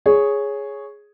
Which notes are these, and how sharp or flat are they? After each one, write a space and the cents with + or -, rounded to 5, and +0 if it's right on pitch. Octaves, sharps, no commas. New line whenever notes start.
G#4 +0 C#5 +0